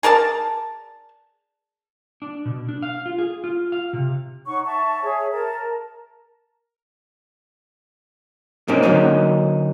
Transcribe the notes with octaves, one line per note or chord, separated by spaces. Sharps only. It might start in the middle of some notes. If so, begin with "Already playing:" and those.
G#4 A#4 D5 A5
D4
B2
D4
F5
F4
G#4
F4
F5
C3
D#4 C#5 F#5 C#6
E5 A5 C#6
G#4 C#5 E5
A#4 A5 A#5
A#4
G#2 C3 A#3 C4 C#4 D#4
D3 F#3 A#3 C#4 D#4